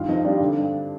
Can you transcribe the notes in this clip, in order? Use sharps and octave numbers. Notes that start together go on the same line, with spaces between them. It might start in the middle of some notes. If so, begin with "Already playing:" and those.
Already playing: G2 D#3 F4 F5
F2 D#4 D#5
G3 D4 D5
D3
G2